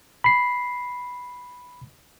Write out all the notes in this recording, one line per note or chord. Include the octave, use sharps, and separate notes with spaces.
B5 C7